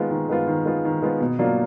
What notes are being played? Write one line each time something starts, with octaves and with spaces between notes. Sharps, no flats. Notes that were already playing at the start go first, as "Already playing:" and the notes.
Already playing: D#3 G#3 B3 F4
D#3
G#3 B3 F4
D#3
G#3 B3 F4
D#3
G#3 B3 F4
B2
F#3 A#3 D4 F4